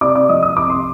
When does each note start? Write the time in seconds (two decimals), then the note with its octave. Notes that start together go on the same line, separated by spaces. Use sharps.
0.01 C3 D5 D6
0.15 D5 D6
0.29 F3 D#5 D#6
0.42 D#6
0.57 C2 D6
0.70 C6